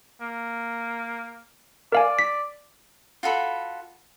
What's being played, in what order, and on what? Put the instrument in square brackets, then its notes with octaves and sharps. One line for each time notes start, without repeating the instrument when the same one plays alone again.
[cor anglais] A#3
[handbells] A#4 F5 G#5 [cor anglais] D5
[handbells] B6
[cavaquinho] F4 F#4 A4 B5